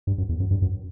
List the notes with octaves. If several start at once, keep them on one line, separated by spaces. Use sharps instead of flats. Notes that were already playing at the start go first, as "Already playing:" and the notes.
G2
F#2
E2
F#2
G2
F#2